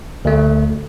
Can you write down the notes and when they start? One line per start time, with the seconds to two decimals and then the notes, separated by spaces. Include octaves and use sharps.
0.25 D2 A3